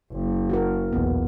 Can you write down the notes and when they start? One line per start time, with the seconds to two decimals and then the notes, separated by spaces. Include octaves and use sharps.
0.13 F#1
0.50 F#4 A#4
0.93 B1 E2 A#2 B3